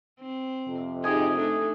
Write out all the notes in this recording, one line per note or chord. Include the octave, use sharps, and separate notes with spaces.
C4
F2 C3
D#4 G4 G#4 D#5 G#5 D#6
A3 D4 D#4 A4